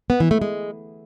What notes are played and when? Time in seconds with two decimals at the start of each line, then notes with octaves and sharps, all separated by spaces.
0.10 B3
0.20 E3
0.31 A3
0.42 G#3